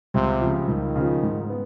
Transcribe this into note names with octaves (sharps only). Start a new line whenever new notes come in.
C#2 C3
C#3 F3
C#2 D#3
C#3 F3
G#2
B3